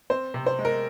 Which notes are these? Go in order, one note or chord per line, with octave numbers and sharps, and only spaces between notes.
C4 C5
C3
C5
G#3
A#4